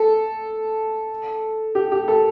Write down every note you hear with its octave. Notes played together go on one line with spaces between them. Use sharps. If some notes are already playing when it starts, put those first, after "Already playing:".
Already playing: A4
G4
G4
A4